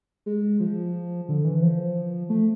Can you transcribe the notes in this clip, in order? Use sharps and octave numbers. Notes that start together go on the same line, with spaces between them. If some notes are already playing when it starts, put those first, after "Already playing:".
G#3
F3
D3
E3
F3
A3